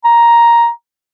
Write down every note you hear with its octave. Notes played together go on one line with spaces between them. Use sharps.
A#5